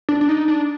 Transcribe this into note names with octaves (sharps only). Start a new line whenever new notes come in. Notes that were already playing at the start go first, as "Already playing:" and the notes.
D4
D4
D#4
D4